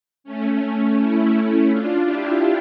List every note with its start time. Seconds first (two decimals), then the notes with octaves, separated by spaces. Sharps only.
0.24 A3 C#4
0.97 C#4 E4
1.70 D4 F4
2.05 E4 G4